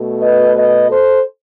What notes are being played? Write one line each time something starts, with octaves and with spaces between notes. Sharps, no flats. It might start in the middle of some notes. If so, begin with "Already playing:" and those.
Already playing: B2 A3
B4 D#5
B4 D#5
A4 C5